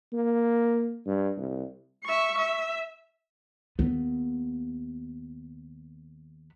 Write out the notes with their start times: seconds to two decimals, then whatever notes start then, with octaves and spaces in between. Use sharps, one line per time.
0.13 A#3
1.06 G2
1.37 C2
2.04 E5 C#6
2.38 E5
3.79 D#2 B3